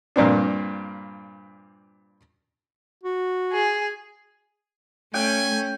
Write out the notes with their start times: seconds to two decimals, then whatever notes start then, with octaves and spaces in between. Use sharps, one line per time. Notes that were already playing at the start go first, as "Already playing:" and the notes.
0.16 G2 A#2 C4 D4
3.03 F#4
3.52 G#4
5.14 A3 C#4 G5 G#5